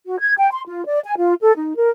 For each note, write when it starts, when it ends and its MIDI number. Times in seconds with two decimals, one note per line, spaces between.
0.06 0.18 66
0.19 0.33 92
0.38 0.48 79
0.51 0.61 84
0.67 0.84 65
0.85 1.00 74
1.04 1.14 80
1.18 1.34 65
1.41 1.52 69
1.56 1.74 63
1.76 1.90 70